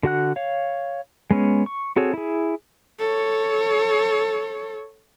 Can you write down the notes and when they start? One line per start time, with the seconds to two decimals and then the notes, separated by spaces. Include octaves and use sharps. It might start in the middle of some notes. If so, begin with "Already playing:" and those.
0.03 D3 F#4 F#5 F#6
0.36 C#5 F5
1.31 G#3 B3 C#4
1.66 C#6
1.96 C4 F#4 G#4 A4 C#5
2.14 E4 G#4
2.99 A4 C#5